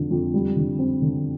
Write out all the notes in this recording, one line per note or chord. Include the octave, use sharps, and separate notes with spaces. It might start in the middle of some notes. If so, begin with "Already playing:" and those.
Already playing: F2 D3
F2
G3
D3
C4
D3